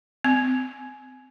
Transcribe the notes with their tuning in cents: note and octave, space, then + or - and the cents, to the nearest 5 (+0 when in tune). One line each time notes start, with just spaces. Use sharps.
C4 -30